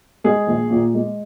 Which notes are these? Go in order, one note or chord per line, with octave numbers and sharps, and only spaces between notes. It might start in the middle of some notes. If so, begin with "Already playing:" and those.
G#3 G#4
A#1
A#2
G#3